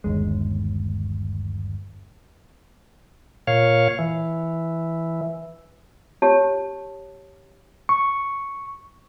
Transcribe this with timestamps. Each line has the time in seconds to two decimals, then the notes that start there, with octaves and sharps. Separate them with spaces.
0.04 G1 D#2 G#3
3.47 A#2 C#5 F5
3.99 E3
6.22 G4 C#5 A5
7.89 C#6